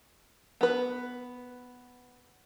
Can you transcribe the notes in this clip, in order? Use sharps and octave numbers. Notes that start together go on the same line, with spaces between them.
B3 B4